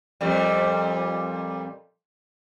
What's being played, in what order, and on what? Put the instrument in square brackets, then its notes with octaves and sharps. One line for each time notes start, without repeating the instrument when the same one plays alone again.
[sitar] F2 A#2 G3